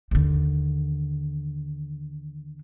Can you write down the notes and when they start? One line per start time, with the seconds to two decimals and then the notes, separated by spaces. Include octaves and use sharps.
0.11 D#2 D3